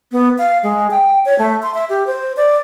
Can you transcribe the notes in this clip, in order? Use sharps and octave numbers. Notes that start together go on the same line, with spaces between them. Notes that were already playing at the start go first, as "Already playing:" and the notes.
B3
F5
G#3
G5
C#5
A3
C6
E5
G4
C5
D5